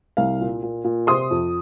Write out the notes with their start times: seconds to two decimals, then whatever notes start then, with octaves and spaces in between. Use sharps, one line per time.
0.17 C2 F5
0.40 A#2
0.63 A#2
0.85 A#2
1.07 C3 C6 D#6
1.31 F2